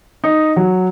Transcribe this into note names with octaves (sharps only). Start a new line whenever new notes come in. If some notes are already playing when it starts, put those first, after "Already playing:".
D#4
F#3